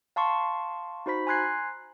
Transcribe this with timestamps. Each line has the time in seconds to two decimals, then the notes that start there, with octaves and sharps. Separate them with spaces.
0.16 F5 A5 C6 C#6
1.06 D#4 F#4 C5 B5 B6
1.27 G#5 A#5 C6 F#6 G#6 C7